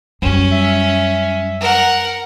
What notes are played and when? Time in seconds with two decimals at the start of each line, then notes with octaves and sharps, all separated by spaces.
0.22 F#2 G3 C#4
0.52 E5
1.61 A#4 F#5